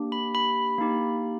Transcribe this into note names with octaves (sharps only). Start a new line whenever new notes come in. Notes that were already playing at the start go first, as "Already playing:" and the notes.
Already playing: A#3 D4 G4
B5
B5
A#3 D#4 G4